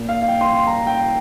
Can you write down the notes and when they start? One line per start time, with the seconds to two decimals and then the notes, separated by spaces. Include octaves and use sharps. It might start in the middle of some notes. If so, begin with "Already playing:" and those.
Already playing: A#2 A#3
0.09 F5
0.22 F5
0.28 G5
0.41 C6
0.54 C6
0.67 A#5
0.87 G5